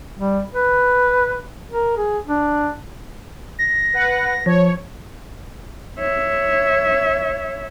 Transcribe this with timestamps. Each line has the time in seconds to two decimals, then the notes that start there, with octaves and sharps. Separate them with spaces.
0.17 G3
0.54 B4
1.71 A#4
1.97 G#4
2.27 D4
3.59 A#6
3.93 B4 F#5
4.46 F3 C#5
5.99 C#5 E5